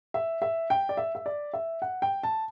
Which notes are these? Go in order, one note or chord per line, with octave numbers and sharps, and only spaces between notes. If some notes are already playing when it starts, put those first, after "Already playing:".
E5
E5
G5
D5
E5
E5
D5
E5
F#5
G5
A5